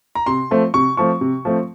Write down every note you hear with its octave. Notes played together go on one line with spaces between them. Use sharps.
A#5
C3 C6
F3 A3 C4
C3 C#6
F3 A3 C4 C#6
C3
F3 A3 C4